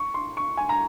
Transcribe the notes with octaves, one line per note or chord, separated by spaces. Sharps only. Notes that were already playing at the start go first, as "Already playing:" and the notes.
Already playing: C#6
C6
C#6
G#5
A#5